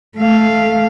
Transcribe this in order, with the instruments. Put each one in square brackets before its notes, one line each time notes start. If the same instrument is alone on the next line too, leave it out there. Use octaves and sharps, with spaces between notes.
[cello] A3 F5